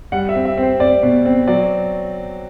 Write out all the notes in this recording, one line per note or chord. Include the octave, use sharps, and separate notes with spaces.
G3 F#5
E5
C4
E5
C4
C5
C4 D5
B2
C4
F#3 D5